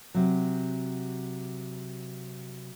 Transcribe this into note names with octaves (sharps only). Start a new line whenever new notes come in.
C3 F#3